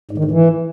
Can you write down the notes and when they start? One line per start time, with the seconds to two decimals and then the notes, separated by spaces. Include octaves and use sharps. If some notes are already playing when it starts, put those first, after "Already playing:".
0.11 G#2
0.18 D#3
0.24 G#2
0.31 E3